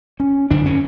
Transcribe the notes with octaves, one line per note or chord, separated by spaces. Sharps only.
C#4
F#2 D3 D4
C#4